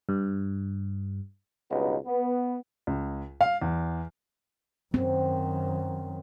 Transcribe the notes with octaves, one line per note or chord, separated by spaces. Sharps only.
G2
C#2 G2 B2 B3 D#4
B3
C#2
F5
E2
F#2 D#3 C4